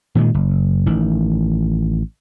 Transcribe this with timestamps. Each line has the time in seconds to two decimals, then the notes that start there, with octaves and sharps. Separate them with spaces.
0.15 A#2 D#3 F3 G#3
0.34 F#1
0.86 A1 D#3